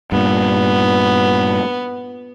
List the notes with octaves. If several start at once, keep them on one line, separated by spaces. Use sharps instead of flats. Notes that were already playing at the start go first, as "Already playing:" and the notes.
G2 A#2 B3